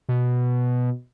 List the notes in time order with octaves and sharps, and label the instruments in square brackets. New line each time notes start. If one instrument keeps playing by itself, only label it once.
[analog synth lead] B2